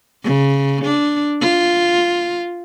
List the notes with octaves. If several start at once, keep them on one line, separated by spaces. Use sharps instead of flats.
C#3
D4
F4